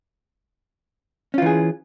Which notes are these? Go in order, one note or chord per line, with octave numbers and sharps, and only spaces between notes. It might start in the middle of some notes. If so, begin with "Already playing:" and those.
E3 C#4 F4 G#4